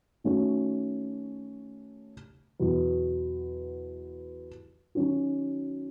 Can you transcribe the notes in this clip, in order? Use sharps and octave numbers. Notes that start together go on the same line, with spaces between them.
D#3 A3 C#4 F#4
E2 B2 F#3
D#3 F#3 C#4 F#4